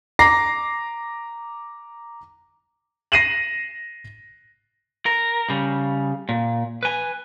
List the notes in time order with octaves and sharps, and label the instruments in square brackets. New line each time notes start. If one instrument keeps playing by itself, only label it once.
[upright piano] A#5 D6 A#6 C7
[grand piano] A#6 C7 D#7 E7 F#7
[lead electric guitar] A#4
C#3 G3
A#2
B4 G#5